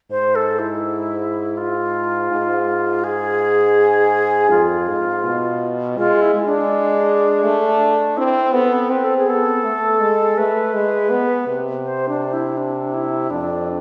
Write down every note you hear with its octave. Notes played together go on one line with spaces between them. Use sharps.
G#2 C5
A4
E4
F4
G#2
G#4
F2 F4
G#2
B2
G#3 F4
E4
G#3
D4
A3
C4 E4
B3 A4
C4 B4
A4
G#4
B3 A4
A3
G#3
A3 B4
G#3
B3
C3
C5
D4
E4
D4
E4
F2 D4